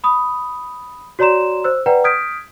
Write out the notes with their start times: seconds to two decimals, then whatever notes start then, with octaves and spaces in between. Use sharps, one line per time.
0.04 B5 D#6
1.19 F#4 C#5 D5 A#5 C6 E7
1.64 C5 E6
1.86 B4 D5 F#5 G5 A#5
2.04 D#6 F6 G6 G#6 B6 D7